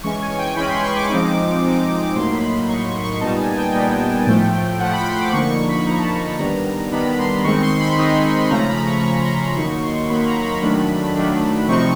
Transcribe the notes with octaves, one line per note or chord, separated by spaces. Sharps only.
E3 G#3 C#4 C#6
G#5
G5
E3 G#3 C#4 B5
C6
C#6
D6
F3 G#3 C4 D#4
F3 G#3 C4 D#4
A2 F#3 A#3 D#4 C6
B5
B5
A2 F#3 A#3 D#4 C#6
C#6
C#6
A#2 G3 B3 D#4 A5
G#5
G5
A#2 G3 B3 D#4
A2 F3 A3
A2 F3 A3 F#5
B5
C6
D6
D3 F3 A#3 D#4 C#6
C#6
B5
D3 F3 A#3 D#4 A#5
A5
A#5
D#3 G3 B3 D4 A#5
D#3 G3 B3 D4 B5
C6
D#3 G#3 C4 D#4 C#6
C6
B5
D#3 G#3 C4 D#4
C#3 F3 A3 C#4 A#5
B5
C#6
C#3 F3 A3 C#4 C#6
C6
A#5
D#3 F#3 A#3 D#4 C#6
C6
D#3 F#3 A#3 D#4 B5
A#5
B5
D#3 F#3 A3 D4
D#3 F#3 A3 D4
C3 F3 A3 C4 D#4 C#6